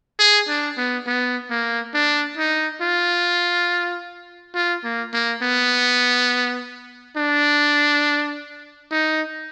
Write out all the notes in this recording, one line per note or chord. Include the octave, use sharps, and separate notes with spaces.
G#4
D4
B3
B3
A#3
D4
D#4
F4
F4
A#3
A#3
B3
D4
D#4